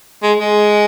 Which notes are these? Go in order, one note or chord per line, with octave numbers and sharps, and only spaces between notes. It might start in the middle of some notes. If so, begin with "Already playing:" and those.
G#3
G#3